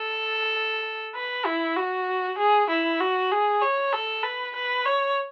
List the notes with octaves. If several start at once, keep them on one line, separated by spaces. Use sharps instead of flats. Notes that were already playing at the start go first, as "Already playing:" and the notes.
Already playing: A4
B4
E4
F#4
G#4
E4
F#4
G#4
C#5
A4
B4
B4
C#5